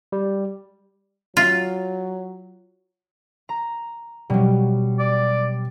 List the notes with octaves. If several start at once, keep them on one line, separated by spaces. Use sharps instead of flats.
G3
F#3 F4
A#5
B2 F#3 G3
D5